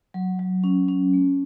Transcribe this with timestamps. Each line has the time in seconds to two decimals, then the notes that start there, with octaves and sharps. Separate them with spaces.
0.14 F#3
0.39 F#3
0.64 C#4
0.89 C#4
1.13 A3